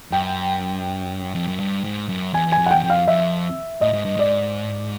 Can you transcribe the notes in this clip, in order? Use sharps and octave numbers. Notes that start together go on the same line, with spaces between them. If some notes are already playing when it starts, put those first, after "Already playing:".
F#2 G5
F2
F#2
G2
G#2
F#2
E2 G#5
E2 G#5
F2
F#5
E2 G5
F2
F5
F2 E5
A2 D#5
G#2
G2
G#2 D5